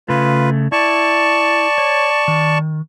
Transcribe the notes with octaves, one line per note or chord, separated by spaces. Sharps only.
C#3 A3 F4 B4
E4 D5 A5 C#6
C#5
D#3